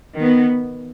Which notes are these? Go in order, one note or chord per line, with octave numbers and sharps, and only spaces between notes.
D#3 B3